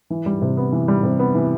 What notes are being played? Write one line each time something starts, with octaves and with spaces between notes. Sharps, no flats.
E3
G3
C3
B3
E3
G3
C3
B3
E3